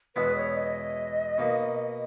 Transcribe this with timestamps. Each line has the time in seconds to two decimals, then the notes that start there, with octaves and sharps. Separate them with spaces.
0.16 E2 B2 G#3 B3 E4 B4
0.36 C#5
0.57 D#5
1.38 B2 A#3 D#4